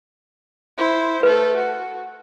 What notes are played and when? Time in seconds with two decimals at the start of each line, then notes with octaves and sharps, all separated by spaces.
0.78 E4 C5
1.23 A3 A4 B4
1.56 F#4